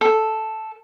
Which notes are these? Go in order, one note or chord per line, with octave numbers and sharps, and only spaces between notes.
A4